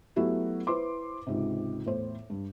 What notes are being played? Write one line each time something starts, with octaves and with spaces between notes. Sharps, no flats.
F#3 A3 B3 E4 F#4 G4
E4 B4 C5 C6 D6
C#2 G#2 C3
E2 A2 C5
G2